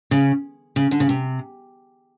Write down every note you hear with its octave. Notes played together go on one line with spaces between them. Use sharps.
C#3
C#3
D3
C#3
C3